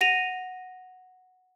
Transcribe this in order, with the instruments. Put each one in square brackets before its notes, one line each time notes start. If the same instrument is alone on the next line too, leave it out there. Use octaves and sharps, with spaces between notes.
[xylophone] F#5 A#6 D#7 F7